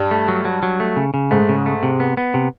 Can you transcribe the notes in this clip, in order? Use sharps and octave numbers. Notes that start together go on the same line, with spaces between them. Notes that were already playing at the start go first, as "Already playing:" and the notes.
Already playing: G2 G3
A3
F#3
F#3
F#3
A3
C#3
C#3
G#2 G#3 A3
C#3
A3
C3
B3
B3
C3